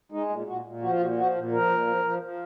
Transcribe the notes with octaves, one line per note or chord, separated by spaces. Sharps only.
G#3 D#4
A#2
A#2 F#4
A#2
F3 F#4
F4
A#2 F#4
F3 F#4
A#2
F3 A#4
A#2
F3
F3
F3